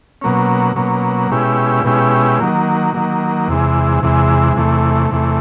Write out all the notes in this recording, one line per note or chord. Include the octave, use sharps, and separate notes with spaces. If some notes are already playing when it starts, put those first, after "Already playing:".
B2 F#3 A#3 C#4
B2 F#3 A#3 C#4
B2 G#3 C#4 E4 G4
B2 G#3 C#4 E4 G4
D#3 F#3 A#3
D#3 F#3 A#3
E2 C3 E3 G#3
E2 C3 E3 G#3
E2 C3 E3 A3
E2 C3 E3 A3